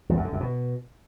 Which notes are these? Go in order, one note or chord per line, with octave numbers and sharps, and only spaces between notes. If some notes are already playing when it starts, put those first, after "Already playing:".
E2
F#2
D3
F#2
B2